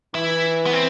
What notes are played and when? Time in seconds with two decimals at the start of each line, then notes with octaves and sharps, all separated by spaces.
0.15 E3 E4
0.66 B3
0.73 C4